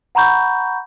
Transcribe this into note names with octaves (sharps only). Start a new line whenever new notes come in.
F#5 A#5 B5 C#6 G6